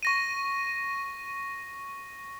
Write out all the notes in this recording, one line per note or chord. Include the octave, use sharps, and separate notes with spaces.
C#6 A#6 D#7